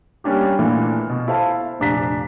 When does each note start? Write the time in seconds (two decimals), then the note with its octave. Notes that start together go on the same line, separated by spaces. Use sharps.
0.24 G3 A#3 C#4 D4 G4
0.59 A#2 E3 A3 A#3 D4
1.09 B2
1.28 E4 A4 C5 F5 A5
1.80 F1 A#1 D4 A#5 B6